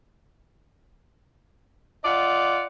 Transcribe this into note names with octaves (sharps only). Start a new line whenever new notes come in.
F4 D5 D#5 F#5